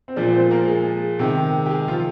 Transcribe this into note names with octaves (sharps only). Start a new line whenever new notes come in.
C4
A#2 F3 G#3 D4
C4 C5
A#3 A#4
G#3 G#4
C3 D#3 G#3
G4
G#3 G#4
F3 F4